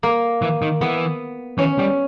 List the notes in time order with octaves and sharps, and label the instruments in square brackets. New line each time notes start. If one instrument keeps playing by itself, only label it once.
[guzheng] A#3
[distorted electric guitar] E3
D#3
[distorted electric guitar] E3 [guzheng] B3
[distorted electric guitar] E3 [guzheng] C#4
[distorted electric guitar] G3